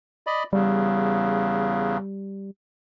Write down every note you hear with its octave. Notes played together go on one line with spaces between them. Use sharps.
D5 D#5 B5
E2 C#3 G3